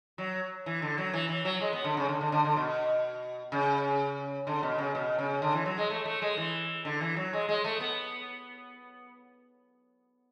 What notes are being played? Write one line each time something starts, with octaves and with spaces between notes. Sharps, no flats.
F#3
E3
D3
F#3
E3
E3
F#3
G#3
B3
D3
C#3
D3
D3
D3
D3
B2
C#3
D3
B2
C#3
B2
C#3
D3
E3
F#3
G#3
A3
A3
G#3
E3
D3
E3
F#3
G#3
G#3
A3
B3